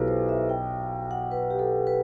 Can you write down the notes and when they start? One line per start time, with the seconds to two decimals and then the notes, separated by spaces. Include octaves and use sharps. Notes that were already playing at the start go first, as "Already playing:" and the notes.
Already playing: B1 E4 G4 A4 B4
0.08 C5
0.29 E5
0.49 G5
1.11 F#5
1.31 B4
1.50 G4
1.59 A4
1.87 B4